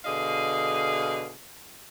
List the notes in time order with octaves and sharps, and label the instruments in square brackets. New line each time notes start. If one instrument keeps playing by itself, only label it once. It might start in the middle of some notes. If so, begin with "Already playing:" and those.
[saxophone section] B2 D3 G#4 D#5 F5